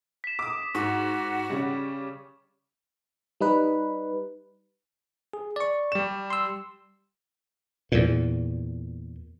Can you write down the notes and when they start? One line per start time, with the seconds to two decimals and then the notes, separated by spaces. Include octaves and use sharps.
0.24 B6 E7
0.39 D6 D#6
0.75 G#2 F#4 C#6 D6
1.50 C#3 G3
3.40 G3 D#4 B4
5.33 G#4
5.56 D5 C#6
5.92 G3 E7
6.30 C6 E6
7.92 E2 A#2